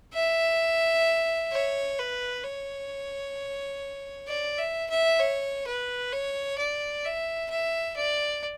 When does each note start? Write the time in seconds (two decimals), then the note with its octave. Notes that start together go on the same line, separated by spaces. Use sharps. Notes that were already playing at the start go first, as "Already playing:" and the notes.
0.14 E5
1.52 C#5
1.99 B4
2.44 C#5
4.28 D5
4.59 E5
4.90 E5
5.20 C#5
5.67 B4
6.12 C#5
6.59 D5
7.05 E5
7.50 E5
7.96 D5